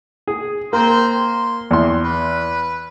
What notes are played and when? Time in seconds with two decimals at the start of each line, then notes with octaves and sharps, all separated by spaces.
0.28 G#4
0.73 A#3 C4 C5
1.12 C6
1.71 E2 C6
2.04 B4